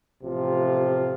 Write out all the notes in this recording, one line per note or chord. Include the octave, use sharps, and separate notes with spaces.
A1 C3 F3 F4